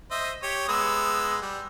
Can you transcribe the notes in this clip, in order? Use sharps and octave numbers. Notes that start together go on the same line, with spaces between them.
C5 D#5 E5
G4 C#5
G#3 B3 E6
G3